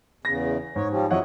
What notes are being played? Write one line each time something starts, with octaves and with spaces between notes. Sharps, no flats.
E2 C#3 A#6
G#2 C#5
F3 G3 C#4
F2 F#3 E4 C#5 D#5 F#5